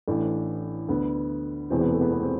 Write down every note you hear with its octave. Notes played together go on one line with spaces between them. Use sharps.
A1 A2 E3 D4
D2 D3 B3
E1 E2 C3 E3 C4
B3
A3
B3
B3
C4